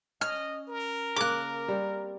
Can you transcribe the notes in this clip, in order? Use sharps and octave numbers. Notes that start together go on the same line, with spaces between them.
C#4 D#5 F6
A#4
C#3 A#3 D6 F#6
G3 C4